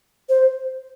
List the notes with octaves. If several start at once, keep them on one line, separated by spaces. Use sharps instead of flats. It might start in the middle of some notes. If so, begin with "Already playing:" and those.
C5